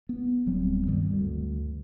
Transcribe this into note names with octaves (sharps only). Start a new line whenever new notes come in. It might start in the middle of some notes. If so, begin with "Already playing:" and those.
B3
D1 F#3 G3 C4
G2 D#3 G3
D2